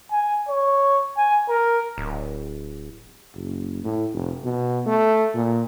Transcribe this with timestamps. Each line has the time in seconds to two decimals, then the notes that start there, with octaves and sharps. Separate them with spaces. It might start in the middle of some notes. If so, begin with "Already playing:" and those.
0.11 G#5
0.48 C#5
1.17 G#5
1.49 A#4
1.98 D1
3.35 F#1
3.84 A2
4.13 F1
4.44 B2
4.86 A3
5.34 A#2